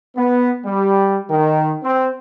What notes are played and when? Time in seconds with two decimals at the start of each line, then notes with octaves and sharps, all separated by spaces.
0.16 B3
0.66 G3
1.30 D#3
1.83 C4